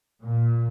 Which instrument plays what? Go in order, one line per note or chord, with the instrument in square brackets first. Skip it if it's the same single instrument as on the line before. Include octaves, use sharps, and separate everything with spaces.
[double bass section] A#2